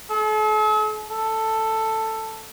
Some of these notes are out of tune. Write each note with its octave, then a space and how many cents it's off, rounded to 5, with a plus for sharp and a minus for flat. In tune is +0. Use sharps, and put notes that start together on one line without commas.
A4 -45
A4 +10